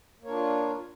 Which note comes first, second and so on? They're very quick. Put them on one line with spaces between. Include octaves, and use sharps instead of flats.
A#3 C#5 D4 F4